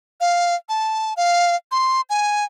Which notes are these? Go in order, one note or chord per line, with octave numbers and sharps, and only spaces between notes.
F5
A5
F5
C6
G#5